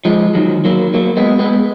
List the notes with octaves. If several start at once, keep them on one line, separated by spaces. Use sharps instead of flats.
F3 G#3
D#3 F#3
F#3 A#3
F#3 A#3
G#3 B3
G#3 B3